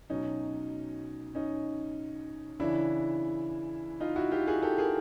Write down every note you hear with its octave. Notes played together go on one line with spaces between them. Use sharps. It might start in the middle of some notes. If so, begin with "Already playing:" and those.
B2 F#3 C#4 D#4
C#4 D#4
C#3 E3 D4 E4
D#4 F4
E4 F#4
F4 G4
F#4 G#4
G4 A4
G#4 A#4